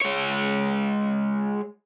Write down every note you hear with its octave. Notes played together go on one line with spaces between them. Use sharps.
G#3 C#5